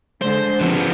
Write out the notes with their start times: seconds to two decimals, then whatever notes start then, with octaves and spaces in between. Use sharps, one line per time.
0.22 D3 G#3 C5
0.60 C3 F3 B3